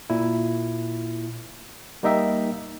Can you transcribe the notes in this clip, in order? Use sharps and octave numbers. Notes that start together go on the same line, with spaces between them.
A#2 E4
G3 A#3 D#4 D#5 E5 G5